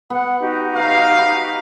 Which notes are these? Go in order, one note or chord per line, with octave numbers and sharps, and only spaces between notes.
B3 F#5
D#4 F#4 G4
B4 F5 A#5
B5